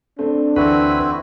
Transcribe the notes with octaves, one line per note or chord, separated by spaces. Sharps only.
A3 C4 D4
D2 D3 E3 C4 E4 F#4 A4 B4